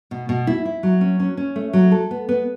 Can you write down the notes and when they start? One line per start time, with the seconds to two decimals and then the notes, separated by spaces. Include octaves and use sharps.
0.11 B2
0.29 B2
0.47 E4
0.65 E4
0.83 F#3
1.01 C#4
1.20 C#4
1.37 C#4
1.56 A3
1.73 F#3
1.91 A4
2.11 B3
2.29 B3